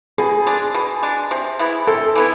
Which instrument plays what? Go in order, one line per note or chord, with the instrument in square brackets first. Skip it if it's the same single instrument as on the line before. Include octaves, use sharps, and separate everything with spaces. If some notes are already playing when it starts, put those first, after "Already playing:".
[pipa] B2 [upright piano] G#4
[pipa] G#3 D4
B2
G#3 D4
C3
E3 B3 E4
[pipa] C3 [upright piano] A4
[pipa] E3 B3 E4